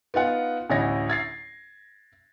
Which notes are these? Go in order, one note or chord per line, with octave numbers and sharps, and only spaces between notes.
B3 D#4 F4 F#5
A1 D2 E4 C#5 A#6
G#6 A6 C7